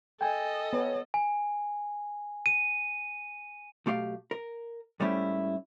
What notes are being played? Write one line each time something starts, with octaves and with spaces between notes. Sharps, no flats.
A4 D#5 G5 G#5
B3 C#5
G#5
D#7
B1 A3 G4 F5
A#4
G#2 G3 A3 C#4 E4 G4